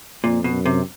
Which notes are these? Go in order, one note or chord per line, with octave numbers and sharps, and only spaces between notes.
F2 A#2
B2
F#2
C3